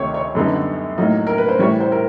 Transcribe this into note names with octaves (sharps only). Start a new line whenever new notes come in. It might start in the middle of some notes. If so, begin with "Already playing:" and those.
Already playing: D2 C3 D#3 C#5
C#5
F#2 D3 G3 B3 D#4
A2 F#3 A#3 D#4
A#4
B4
C5
A2 E3 G3 C#5
C5
A#4